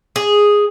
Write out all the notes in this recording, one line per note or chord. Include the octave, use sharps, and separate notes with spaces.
G#4